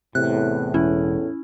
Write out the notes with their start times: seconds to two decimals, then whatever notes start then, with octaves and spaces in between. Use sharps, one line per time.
0.15 E2 A2 C3 F#6
0.74 E1 C#4 E4